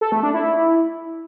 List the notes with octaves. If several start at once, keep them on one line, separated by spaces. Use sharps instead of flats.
A4
A3
D4
E4